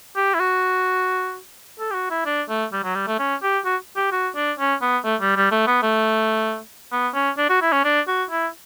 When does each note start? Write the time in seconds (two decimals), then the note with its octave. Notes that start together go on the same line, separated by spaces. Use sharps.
0.16 G4
0.34 E4
0.40 F#4
1.79 A4
1.91 G4
1.94 F#4
2.10 E4
2.26 D4
2.49 A3
2.72 G3
2.84 F#3
2.95 G3
3.07 A3
3.19 C#4
3.43 G4
3.65 F#4
3.96 G4
4.12 F#4
4.36 D4
4.59 C#4
4.81 B3
5.05 A3
5.21 G3
5.36 G3
5.51 A3
5.67 B3
5.82 A3
6.92 B3
7.14 C#4
7.38 D4
7.49 F#4
7.62 E4
7.72 C#4
7.84 D4
8.07 F#4
8.31 E4